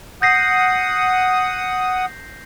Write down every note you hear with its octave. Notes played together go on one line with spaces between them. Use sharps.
F#5 D#6 G6 A#6 C7